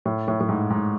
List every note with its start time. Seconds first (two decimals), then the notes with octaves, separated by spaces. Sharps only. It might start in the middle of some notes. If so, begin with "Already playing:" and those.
0.05 A2
0.28 A2
0.40 A2
0.49 G#2
0.70 G#2